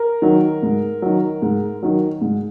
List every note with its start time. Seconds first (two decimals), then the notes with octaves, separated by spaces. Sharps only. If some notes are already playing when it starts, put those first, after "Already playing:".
Already playing: A#4
0.22 D#3 F#3
0.62 G#2
1.02 D#3 F#3
1.42 G#2
1.83 D#3 F#3
2.21 G#2